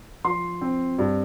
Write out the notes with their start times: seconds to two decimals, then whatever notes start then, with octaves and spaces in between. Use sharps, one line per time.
0.24 F3 C6
0.61 C4
0.99 G2